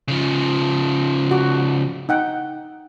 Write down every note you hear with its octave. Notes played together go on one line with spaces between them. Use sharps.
C#3 F3
F#4
D#4 F#5 G5